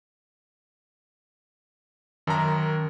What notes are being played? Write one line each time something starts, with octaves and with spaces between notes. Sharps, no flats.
F#2 D#3 A5 A#5